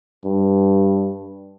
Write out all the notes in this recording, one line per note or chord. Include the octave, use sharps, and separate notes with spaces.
G2